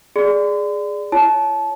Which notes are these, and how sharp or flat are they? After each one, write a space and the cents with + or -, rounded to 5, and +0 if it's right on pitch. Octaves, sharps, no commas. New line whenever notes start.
G#4 +0 D5 +0 C6 -45
E4 +35 C#5 +0 A5 -25